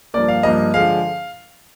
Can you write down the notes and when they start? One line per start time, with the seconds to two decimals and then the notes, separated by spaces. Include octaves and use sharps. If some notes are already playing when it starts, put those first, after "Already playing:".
0.14 G2 F3 A#3 D5
0.28 F5
0.43 G2 F3 A#3 D#5
0.73 D3 F3 G#3 F5